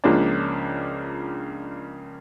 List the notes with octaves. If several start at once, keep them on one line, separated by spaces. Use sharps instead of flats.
C#2 C#3 F3 A#3 D4